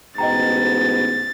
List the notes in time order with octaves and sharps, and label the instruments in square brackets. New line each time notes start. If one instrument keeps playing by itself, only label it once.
[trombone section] A1 G#2 B2 [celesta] D#5 G5 A#5 [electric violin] A6